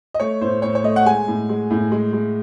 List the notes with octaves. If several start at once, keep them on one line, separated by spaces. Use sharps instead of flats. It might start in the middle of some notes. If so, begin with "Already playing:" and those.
D#5
A3 C#5
A2 C5
A2 C#5
C#5
A3 D#5
F#5
G#3 G#5
A2
G#3
A2
G#3
G#3